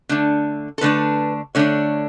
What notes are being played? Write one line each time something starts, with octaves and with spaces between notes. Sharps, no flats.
D3 A3 D4
A4
D3 A3 D4 B4
D3 A3 D4 C#5